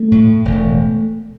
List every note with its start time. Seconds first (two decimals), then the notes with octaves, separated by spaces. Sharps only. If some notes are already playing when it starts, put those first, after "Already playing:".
Already playing: A3
0.12 A2
0.45 E1